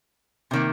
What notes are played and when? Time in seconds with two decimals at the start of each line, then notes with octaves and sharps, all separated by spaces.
0.51 C3 D#3 A#3